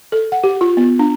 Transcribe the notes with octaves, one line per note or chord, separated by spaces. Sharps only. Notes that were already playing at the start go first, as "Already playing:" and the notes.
A4
F#5
G4
F4
B3
D4